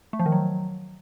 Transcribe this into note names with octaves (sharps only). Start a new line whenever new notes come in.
A3
F3
D#3
F#3